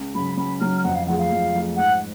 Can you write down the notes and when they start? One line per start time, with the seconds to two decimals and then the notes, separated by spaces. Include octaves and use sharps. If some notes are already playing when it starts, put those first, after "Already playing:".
Already playing: C#2
0.15 C#3 F#3 B5
0.38 C#2 B5
0.60 C#3 F#3 F6
0.84 F2 F#5
0.95 F5
1.07 F3 A3 F4 G#4 F#5
1.19 F5
1.31 F2
1.54 F3 A3 F4 G#4
1.76 G#2 F#5